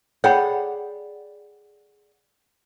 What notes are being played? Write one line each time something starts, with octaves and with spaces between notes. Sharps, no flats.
G#4 C#5 D5 F#5 G5 B5